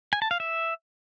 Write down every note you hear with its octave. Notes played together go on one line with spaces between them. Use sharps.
G#5
A5
F5
E5